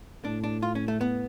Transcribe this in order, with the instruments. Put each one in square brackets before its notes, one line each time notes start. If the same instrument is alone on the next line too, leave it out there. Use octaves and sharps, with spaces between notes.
[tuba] A2 [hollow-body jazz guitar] D4
[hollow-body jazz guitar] D4
F4
C#4
A3
B3